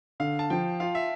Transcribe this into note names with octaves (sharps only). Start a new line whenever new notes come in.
D3 F5
A5
F3 G5
F4 F5
E5